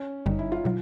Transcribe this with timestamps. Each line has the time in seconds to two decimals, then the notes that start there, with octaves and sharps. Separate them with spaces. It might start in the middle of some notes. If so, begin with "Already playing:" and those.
Already playing: C#4
0.26 G1 F#2 D3 G3 D#4
0.39 E4
0.52 F4
0.64 B2 F#3 F4